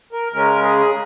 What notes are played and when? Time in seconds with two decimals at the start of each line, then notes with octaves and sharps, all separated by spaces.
0.13 A#4
0.32 C#3 G#3 C#4 A#4
0.63 G#4